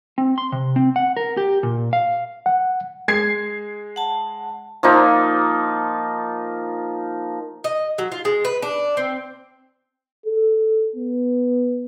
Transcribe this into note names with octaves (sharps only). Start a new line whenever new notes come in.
C4
C6
C3
C4
F#5
A#4
G4
A#2
F5
F#5
G#3 G#6 C7
F#5 A5
F3 A#3 D#4 F4
D#5
F#3
F4
G#3
B4
D4
C4
A4
B3